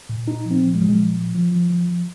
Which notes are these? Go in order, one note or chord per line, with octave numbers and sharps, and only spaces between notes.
A#2
A#2 D#4
F3
C4
F3
G#3
A#2 F#3
G#3
F3
F3
F3
F3
F3
F3